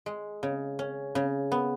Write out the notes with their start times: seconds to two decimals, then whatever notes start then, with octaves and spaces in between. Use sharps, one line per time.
0.06 G#3
0.43 C#3
0.79 C#4
1.15 C#3
1.52 B3